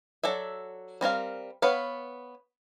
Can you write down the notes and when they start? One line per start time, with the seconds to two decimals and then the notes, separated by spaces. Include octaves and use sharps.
0.23 F#3 A4 D5 E5
1.01 G3 C4 A#4 F5
1.62 B3 B4 C#5 F5